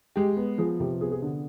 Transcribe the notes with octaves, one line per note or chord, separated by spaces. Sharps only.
G#3 G4
B3
F3 G#4
C3 G4
B3 G#4
G#4
D3